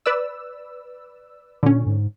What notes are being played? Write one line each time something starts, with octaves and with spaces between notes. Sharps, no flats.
B4 D5 E6
A#2 D3 C#4
G#2